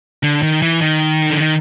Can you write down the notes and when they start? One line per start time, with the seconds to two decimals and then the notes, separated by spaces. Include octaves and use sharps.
0.23 D3
0.43 D#3
0.62 E3
0.81 D#3
1.30 D3
1.40 D#3